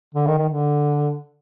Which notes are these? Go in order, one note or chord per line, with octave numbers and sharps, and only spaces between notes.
D3
D#3
D#3
D3